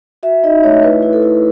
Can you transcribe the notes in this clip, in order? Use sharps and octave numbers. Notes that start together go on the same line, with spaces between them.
F#4 E5
D#4 D#5
A3 C#5
E4 B4
E4
A4
E4